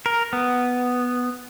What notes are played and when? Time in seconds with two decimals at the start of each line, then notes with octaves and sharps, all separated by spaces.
0.06 A#4
0.33 B3